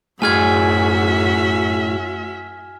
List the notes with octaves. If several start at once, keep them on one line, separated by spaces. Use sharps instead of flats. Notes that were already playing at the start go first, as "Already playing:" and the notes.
F#2 A2 F#4 G#4 E5 G#5 F6 G#6